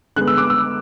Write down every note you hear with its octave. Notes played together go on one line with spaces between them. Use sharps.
D3 G#3 B3 F#6
E6
D6
E6